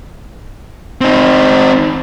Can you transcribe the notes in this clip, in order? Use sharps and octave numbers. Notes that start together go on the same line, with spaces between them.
C4 D#4